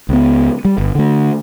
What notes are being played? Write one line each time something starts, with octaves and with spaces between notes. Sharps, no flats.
C#2 B3
G3
G1
D3 A3